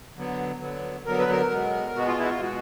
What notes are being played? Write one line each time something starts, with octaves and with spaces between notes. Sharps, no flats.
D3 F#3 B3
D3 F#3 B3
D3 F#3 B3 A#4
B4
A#4
B2 G#3 B3
B2 G#3 B3 F#4
F4
E4
F#4
F4
B2 G#3 B3 F#4